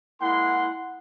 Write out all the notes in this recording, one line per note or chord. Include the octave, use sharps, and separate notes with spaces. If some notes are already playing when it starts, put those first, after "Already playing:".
G#3 A#3 E4 F#5 C6